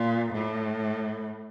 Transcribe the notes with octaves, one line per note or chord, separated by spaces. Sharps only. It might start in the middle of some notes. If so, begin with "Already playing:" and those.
Already playing: A#2
A2